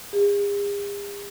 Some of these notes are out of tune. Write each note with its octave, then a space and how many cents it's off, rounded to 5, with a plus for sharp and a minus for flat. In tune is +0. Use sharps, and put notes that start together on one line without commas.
G#4 -45